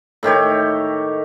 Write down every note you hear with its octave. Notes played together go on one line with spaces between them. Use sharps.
A2 D#3 G4 C#5